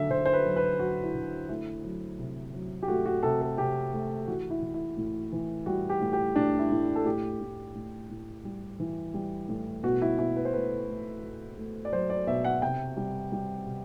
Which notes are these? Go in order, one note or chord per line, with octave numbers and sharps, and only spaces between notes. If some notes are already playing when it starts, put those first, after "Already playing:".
Already playing: D3 F#3 A3 E5
D3 C5
C5
B4
F#3
B4
F#3 F#4
E4
D3
A3 E4
F#3
C3
F#3
G4
A3 F#4
F#4
C3 A4
A4
C3 G4
A3
E3 F#4
E4
E3
E4
A2
E3
G3 F#4
G4
A2
G4
A2 D4
E4
A2
A4
A2 G4
A2
A2
A2
G3
E3
G3
A2
B2 F#4
E4
B2 E4
B4
C5
A3 B4
A3
A3
A3
D5
F#3 C5
D5
B2 E5
F#5
C3 G5
G3
G3
C3